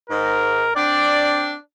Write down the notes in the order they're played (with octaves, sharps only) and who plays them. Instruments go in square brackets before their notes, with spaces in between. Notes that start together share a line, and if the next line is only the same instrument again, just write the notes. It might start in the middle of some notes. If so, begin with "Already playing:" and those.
[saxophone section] G#2 [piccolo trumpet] A#4
[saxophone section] C4 D4 [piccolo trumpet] D5